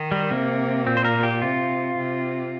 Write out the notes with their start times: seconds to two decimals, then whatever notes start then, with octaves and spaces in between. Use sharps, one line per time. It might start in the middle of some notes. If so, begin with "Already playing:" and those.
Already playing: D#3
0.12 G3
0.30 C3 A#3
0.86 A#2 C4
0.97 C5
1.05 A#4
1.23 G4
1.42 C3 F4
1.97 C3